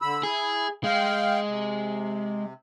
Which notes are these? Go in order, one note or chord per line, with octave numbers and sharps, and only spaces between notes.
D3 B5 E6
E4 G#4
G#3 F5 G5
C3